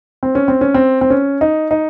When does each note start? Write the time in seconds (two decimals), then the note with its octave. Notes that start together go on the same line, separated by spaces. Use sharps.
0.23 C4
0.35 C#4
0.48 C4
0.61 C#4
0.74 C4
1.01 C4
1.10 C#4
1.41 D#4
1.71 D#4